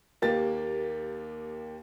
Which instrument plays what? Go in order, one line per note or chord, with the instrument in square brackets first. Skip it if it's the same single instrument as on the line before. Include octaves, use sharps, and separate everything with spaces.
[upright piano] D#2 A#3 G4 A6